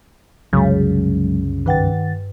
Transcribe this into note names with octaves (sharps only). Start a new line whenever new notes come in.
C2 F#2 C#3 F#3 G#3
G2 D#3 B4 F#5 G5 A6